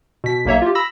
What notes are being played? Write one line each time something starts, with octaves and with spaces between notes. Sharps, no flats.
B2 B6
B1 A#3 C#5 E5
F4 G4
B5 E6 A#6